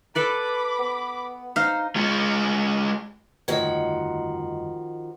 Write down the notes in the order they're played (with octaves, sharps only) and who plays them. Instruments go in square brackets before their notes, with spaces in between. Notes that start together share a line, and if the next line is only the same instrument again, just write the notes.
[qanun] A4 B4 D5 [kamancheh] B5 D6
[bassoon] B3
[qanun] D#4 C5 [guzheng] F5
[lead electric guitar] G#3 F4
[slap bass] G1 F2 A3 [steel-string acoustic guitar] D#3 F3 F#4 [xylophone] C#5 D#5